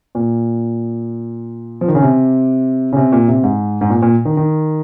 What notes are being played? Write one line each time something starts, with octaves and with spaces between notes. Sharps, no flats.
A#2
F3
D#3
C#3
C3
C#3
C3
A#2
C3
G#2
G#2
A#2
A#2
D#3
D#3